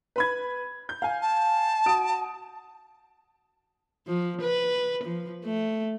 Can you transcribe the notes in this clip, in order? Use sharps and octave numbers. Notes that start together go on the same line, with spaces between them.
B4 B5 G#6
G6
F5 G#5
A5
F#4 D#6 D7
F3
B4
F3
A3